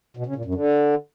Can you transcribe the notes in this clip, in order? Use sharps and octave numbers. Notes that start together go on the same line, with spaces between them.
B2
C#3
A#2
F#2
D3